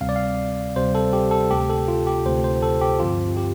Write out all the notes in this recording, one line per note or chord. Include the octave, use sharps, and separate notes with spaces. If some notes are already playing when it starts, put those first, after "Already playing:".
D2 C3 G3 C4 F5
D5
F5
D2 C3 G3 C4 C5
A4
G4
A4
D2 C3 A3 G4
A4
F4
G4
D2 C3 A3 C5
C5
A4
G4
G2 D3 F3 C4 F4
G4